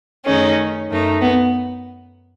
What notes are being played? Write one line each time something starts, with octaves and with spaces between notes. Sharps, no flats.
F#2 D#3 A3 C#4 D#4 G#4
F#2 D#3 A3 D#4
B3